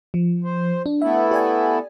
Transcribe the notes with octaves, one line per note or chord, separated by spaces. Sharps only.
F3
C5
D4
A3 B3 E4 E5
G4 D5 G#5